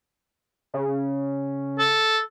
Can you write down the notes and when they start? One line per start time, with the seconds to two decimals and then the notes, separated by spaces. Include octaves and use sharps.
0.74 C#3
1.79 A4